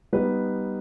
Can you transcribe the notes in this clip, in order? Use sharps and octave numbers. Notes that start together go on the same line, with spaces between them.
G3 B3 D#4 B4